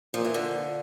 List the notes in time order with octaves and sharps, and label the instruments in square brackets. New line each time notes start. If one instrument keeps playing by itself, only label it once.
[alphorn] A#2 [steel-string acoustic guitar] F3
[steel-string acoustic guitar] E3
D3 F3